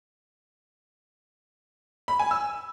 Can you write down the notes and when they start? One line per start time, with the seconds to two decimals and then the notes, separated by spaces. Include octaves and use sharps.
2.08 B5
2.19 G#5
2.31 E6